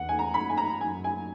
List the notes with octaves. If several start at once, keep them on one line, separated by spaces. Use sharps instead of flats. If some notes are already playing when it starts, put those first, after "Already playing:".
Already playing: E2 F#5
G#5
A#5
F#2 B5
G#5
A#5
F#2 G#5
G#5